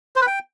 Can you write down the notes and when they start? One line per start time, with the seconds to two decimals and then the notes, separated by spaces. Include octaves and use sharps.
0.16 C5
0.22 B4
0.27 G5